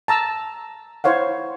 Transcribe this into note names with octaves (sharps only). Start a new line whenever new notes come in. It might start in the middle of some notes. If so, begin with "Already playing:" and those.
A5 A#5 E6
E4 C5 C#5 F5 F#5